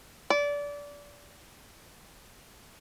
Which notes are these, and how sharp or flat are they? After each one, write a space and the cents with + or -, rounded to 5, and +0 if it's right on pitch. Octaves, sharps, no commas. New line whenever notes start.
D5 -25